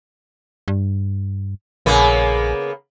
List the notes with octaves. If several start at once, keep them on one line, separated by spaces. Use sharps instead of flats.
G2
A#1 C#3 A#3 B3